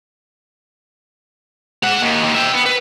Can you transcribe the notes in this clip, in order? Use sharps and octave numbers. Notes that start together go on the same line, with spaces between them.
G#3 F#5
D#2
D#2
E5 G5
B3
B4